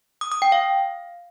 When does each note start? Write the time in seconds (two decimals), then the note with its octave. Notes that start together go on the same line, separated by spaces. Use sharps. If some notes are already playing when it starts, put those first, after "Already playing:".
0.21 D#6
0.32 D#6
0.42 G5
0.52 F5